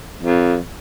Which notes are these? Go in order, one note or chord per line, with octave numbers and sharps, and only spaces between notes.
F2